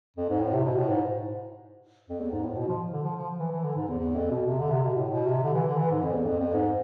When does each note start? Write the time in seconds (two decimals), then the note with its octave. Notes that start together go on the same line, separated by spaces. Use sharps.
0.16 F2
0.29 G#2
0.40 A2
0.53 C3
0.65 B2
0.77 A2
0.89 G#2
2.08 F2
2.21 E2
2.32 G#2
2.43 A2
2.56 B2
2.68 F3
2.92 D3
3.04 F3
3.16 F3
3.39 E3
3.52 E3
3.64 D3
3.75 G#2
3.87 E2
3.99 E2
4.16 F2
4.31 B2
4.46 C3
4.60 D3
4.71 C3
4.83 B2
4.95 A2
5.11 B2
5.27 C3
5.43 D3
5.54 E3
5.67 D3
5.78 E3
5.91 G#2
6.02 F2
6.14 E2
6.26 F2
6.39 F2
6.54 G#2